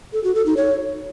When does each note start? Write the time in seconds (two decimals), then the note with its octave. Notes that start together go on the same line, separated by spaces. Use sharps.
0.13 A4
0.24 F#4
0.35 A4
0.46 D#4
0.57 C#5